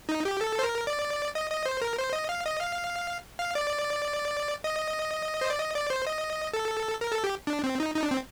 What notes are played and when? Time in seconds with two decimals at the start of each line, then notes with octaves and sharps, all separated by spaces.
0.09 D#4
0.25 G4
0.41 A4
0.59 C5
0.63 A#4
0.87 D5
1.35 D#5
1.51 D#5
1.66 C5
1.82 A#4
1.98 C5
2.13 D#5
2.29 F5
2.45 D#5
2.61 F5
3.39 F5
3.55 D5
4.64 D#5
5.41 C5
5.50 D5
5.59 D#5
5.75 D5
5.90 C5
6.07 D#5
6.53 A4
7.01 A#4
7.12 A4
7.24 G4
7.47 D4
7.64 C4
7.80 D#4
7.95 D#4
8.03 D4
8.11 C4